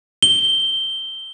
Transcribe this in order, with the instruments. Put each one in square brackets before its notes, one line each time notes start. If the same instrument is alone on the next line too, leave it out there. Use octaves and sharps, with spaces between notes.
[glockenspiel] G7